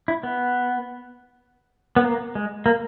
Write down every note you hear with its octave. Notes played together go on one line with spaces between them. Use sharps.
E4
B3
B3
A#3
G#3
A#3